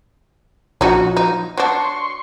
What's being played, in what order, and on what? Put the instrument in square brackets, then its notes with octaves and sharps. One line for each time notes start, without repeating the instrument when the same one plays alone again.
[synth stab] A#1 F#4 [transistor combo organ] F3 [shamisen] C#4 D#4
[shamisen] D#4
[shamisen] F#3 D4 [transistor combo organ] C6 C#6